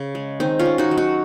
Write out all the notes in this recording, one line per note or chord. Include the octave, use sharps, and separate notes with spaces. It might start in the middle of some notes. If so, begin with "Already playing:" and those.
Already playing: C#3
G#3
D#3 C4 D#4
C#4 F4
D#3
D#4 F#4
F#3
D#4 F#4